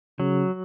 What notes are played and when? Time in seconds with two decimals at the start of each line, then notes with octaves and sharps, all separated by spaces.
0.19 C#3 F#3